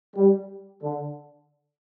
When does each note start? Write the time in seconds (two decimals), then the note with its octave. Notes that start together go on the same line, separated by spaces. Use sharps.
0.16 G3
0.83 D3